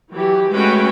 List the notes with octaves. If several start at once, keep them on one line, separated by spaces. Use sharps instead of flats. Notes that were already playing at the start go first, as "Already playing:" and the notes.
E3 F#3 G4
G#3 A3 C#4 F#4 B4 G5